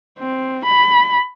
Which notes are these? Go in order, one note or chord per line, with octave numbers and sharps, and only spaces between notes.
C4
B5